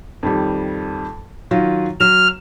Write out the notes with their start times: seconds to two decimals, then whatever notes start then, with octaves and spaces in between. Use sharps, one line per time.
0.23 F2 D#3 G3
1.51 D#3 F#3 F4
2.00 F#3 F6 E7